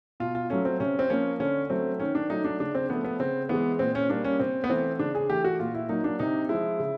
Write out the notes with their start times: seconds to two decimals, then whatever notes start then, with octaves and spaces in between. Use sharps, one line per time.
0.20 B2 F4
0.35 F4
0.50 F#3 A3 C#4
0.65 C4
0.80 C3 C#4
0.99 C4
1.10 F3 A#3 C#4
1.40 D3 C#4
1.70 F#3 A3 C4
2.00 D#3 C#4
2.15 D4
2.30 F#3 A3 D#4
2.45 D4
2.60 C#3 D4
2.75 C4
2.90 F3 A3 B3
3.04 B3
3.20 C#3 C4
3.49 E3 G#3 B3
3.79 A#2 C4
3.95 C#4
4.09 G3 A#3 D4
4.24 C#4
4.40 C3 C4
4.64 B3
4.70 E3 A3 C4
4.99 C#3 D4
5.15 G#4
5.29 E3 A3 G4
5.44 F#4
5.60 A#2 F4
5.74 E4
5.89 F#3 A#3 D#4
6.04 D4
6.19 C3 D#4
6.49 F3 G#3 E4
6.79 C#3